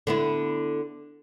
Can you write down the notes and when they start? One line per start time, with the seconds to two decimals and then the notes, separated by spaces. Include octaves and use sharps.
0.07 D3 B3 E4